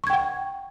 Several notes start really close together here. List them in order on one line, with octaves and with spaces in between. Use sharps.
C#6 G#6 G5 F#5